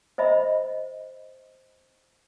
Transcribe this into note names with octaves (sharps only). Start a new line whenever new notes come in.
C5 D#5 E5 B5